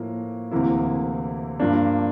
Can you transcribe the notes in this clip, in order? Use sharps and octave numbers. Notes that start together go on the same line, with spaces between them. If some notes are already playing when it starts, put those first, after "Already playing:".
Already playing: A2 F3 A#3
D2 C3 E3 A#3 E4
G2 F3 A#3 D4